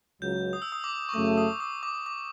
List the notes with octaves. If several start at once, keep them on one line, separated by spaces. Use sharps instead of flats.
C#2 C#3 F#3 G6
D#6
E6
D#6
D6
C#6
F#2 C#3 F#3 A3 D6
D#6
D#6
D6
D6